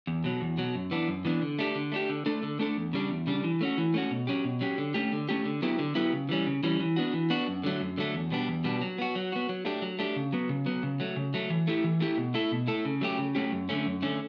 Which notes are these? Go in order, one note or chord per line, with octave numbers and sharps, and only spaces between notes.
E2
B2 F#3
E2
B2 F#3
F#2
E3 B3 D4
F#2
E3 B3 D4
D3
A3 D4 G4
D3
A3 D4 G4
D3
A3 D4 A4
D3
A3 D4 A4
E2
C#3 G3 D4
E2
C#3 G3 D4
E3
A3 C#4 F#4
E3
A3 C#4 F#4
B2
F#3 C#4 G4
B2
F#3 C#4 G4
D3
A3 C#4 G4
D3
A3 C#4 G4
D3
F#3 B3 E4 G4
D3
F#3 B3 E4 G4
C#3
E3 G3 C#4
C#3
E3 G3 C#4
E3
B3 D4 F#4
E3
B3 D4 F#4
F#2
D3 F#3 A3
F#2
D3 F#3 A3
E2
B2 G3 B3 D4
E2
B2 G3 B3 D4
F#3
B3 F#4
F#3
B3 F#4
F#3
A3 D4 G4
F#3
A3 D4 G4
C#3
F#3 B3
C#3
F#3 B3
C#3
F#3 A3
C#3
F#3 A3
E3
A3 E4 G4
E3
A3 E4 G4
B2
A3 E4 A4
B2
A3 E4 A4
C#3
F#3 A3 C#4 G4
C#3
F#3 A3 C#4 G4
F#2
D3 A3 C#4
F#2
D3 A3 C#4